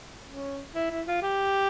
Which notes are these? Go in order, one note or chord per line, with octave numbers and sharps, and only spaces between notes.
C#4
E4
E4
F4
G4